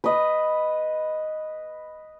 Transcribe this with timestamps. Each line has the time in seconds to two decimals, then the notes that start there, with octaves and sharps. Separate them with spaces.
0.04 B4 D#5